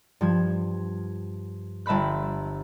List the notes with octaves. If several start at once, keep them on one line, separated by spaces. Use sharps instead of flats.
G2 F3 G#6
G1 E5 A5 B5 F#6